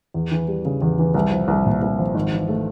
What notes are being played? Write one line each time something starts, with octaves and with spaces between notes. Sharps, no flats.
E2
E3
G3
C#3
E2
E3
C2
F3
C2
A#2
C2
F3
G#1
E3
A3